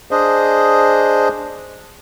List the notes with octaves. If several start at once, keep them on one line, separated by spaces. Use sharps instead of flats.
D4 G#4 C5 D#5